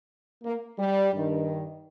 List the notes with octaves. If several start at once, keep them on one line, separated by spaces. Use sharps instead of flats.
A#3
G3
G2 D#3